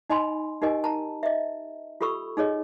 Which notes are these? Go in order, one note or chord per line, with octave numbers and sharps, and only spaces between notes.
D#4 D#5 G#5 B5 C6
D#4 G4 A#4 D#5 G#5
A5 A#5
D#5 E5
F4 G4 A4 B5 C#6 E6
D#4 G#4 C#5 D#5